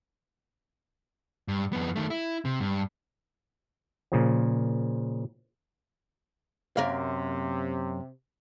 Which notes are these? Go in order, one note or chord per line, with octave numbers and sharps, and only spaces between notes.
G2
F2 B3
D#3 A3
E4
C3
G2
A#2 C#3 F3
F#2 C3 A#3 F5